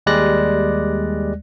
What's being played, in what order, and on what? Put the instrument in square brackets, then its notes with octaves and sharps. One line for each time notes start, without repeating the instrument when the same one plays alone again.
[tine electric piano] D#2 G3 G#3 D5 F#6 A#6